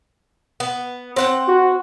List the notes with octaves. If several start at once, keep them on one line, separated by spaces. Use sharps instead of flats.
B3
C4 F#5 G5
F#4